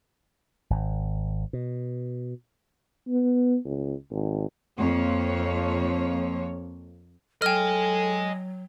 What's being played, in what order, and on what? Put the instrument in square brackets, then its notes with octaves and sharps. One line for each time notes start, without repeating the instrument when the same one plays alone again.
[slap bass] G#1
B2
[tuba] B3
C#2
G#1
[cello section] F2 A#3 C#5
[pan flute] F#3 [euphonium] A4 [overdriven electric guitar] D#5 G#5 [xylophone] G5 F6